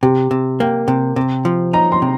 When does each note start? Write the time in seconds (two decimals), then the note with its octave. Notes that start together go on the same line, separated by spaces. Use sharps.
0.03 C3 G4
0.31 C3
0.60 A#3 G5
0.88 C3
1.16 C3
1.45 F3
1.73 D#4 A#5
1.92 C6
2.02 C3